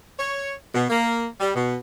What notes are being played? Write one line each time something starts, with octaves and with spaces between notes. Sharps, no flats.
C#5
B2
A#3
G3
B2